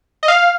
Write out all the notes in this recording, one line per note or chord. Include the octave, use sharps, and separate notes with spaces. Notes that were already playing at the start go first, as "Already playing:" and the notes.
D#5
F5